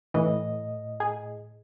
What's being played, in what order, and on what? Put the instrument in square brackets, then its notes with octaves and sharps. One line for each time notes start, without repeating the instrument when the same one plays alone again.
[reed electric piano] A2 D#5 [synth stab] E3
[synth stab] G#4